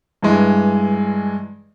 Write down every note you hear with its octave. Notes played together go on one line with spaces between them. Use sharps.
G2 E3 G#3